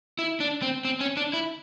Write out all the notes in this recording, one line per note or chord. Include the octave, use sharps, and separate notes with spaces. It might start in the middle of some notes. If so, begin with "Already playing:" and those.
E4
D4
C4
C4
C#4
D4
E4